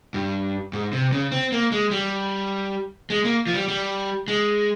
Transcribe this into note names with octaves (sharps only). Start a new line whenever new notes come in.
G2
G#2
C3
C#3
C4
A#3
G#3
G3
G#3
A#3
F3
G3
G3
G#3